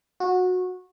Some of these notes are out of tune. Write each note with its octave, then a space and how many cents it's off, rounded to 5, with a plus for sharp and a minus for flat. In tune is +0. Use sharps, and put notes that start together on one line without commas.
F#4 -20